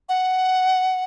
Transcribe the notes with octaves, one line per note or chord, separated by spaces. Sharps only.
F#5